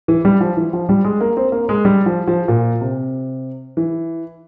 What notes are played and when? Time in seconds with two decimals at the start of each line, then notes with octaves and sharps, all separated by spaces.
0.08 E3
0.25 G3
0.40 F3
0.57 E3
0.73 F3
0.89 G3
1.04 G#3
1.21 A#3
1.37 C4
1.52 A#3
1.69 G#3
1.85 G3
2.06 F3
2.28 F3
2.48 A#2
2.81 C3
3.77 E3